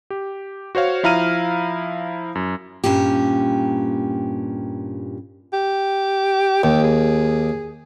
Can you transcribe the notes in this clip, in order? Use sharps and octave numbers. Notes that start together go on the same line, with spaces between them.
G4
F#4 C5 C#5 F5
F3 E4 F5 A#5 F6 D#7
F#2
G2 A#2 C#4 G4
G4
D#2 G4
G#4